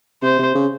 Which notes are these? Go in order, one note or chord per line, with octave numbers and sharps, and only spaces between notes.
C3 C5
C3
C#3